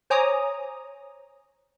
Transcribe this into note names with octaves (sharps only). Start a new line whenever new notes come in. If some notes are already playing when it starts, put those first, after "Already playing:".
C5 C#5 G#5 A#5 D6 D#6